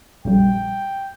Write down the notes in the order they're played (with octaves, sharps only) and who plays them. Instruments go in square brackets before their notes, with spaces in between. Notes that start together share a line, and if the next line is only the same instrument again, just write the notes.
[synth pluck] A#1 F2 G3 [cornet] G5